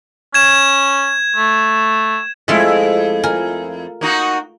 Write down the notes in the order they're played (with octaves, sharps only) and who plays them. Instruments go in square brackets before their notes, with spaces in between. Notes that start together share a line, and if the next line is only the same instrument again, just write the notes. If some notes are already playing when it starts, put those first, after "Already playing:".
[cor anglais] C#4 [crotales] G#6 E7
[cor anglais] A3
[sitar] F2 E4 [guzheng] G#3 A3 F4
[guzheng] A#4 G#5
[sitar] A#3 D#4 F#4